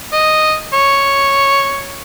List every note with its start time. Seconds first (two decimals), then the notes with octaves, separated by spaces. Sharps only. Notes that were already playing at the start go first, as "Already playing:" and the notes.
0.12 D#5
0.73 C#5